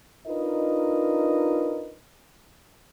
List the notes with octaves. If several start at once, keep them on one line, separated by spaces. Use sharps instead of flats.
D4 D#4 F4 A#4 B4 D#5